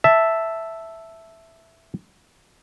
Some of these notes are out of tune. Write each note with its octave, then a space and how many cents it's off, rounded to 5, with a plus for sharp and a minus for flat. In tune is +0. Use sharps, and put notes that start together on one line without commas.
E5 +0 A5 +0